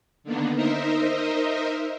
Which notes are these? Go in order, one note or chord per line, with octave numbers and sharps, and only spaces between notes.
D3 D#3 A#3 B3 D4
D#4 A#4 C5 D#5 E5